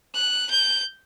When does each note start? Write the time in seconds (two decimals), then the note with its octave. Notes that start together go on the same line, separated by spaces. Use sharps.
0.15 F#6
0.50 G6